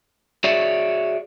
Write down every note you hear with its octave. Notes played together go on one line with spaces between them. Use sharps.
F#4 G#4 C#5 D5 E5